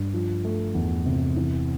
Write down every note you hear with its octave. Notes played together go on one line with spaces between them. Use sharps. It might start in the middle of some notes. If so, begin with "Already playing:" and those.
Already playing: G2
F3
A3
E2
C3
E3